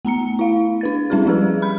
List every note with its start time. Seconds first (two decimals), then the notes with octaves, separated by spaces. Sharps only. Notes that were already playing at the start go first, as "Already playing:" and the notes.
0.05 A3 B3 A#5 C#7
0.39 E4 F5
0.81 D4 B4 A6
1.10 G3 C4 C#4 E4 G#4
1.26 F3 G3 C#4 G4 G#4 B4
1.62 B5 F6 G6